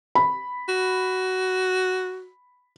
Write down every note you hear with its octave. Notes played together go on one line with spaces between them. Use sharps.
B5
F#4